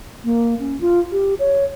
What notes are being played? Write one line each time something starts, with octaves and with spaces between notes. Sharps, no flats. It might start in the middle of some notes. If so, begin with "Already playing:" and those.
A#3
C#4
F4
G4
C#5